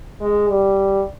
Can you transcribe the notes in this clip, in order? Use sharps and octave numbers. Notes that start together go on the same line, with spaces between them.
G#3
G3